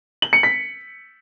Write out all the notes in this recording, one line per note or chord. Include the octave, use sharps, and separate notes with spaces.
F#7
C#7
B6